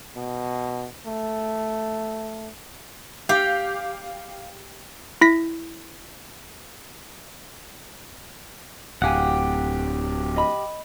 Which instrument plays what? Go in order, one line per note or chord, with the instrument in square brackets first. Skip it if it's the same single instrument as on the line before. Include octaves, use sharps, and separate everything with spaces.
[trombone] B2
A3
[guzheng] G4 [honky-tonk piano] F5
[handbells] E4 A#6 B6
[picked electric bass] D1 [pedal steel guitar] G4 F#5 [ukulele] G#4 F5 G#5
[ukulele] D#5 B5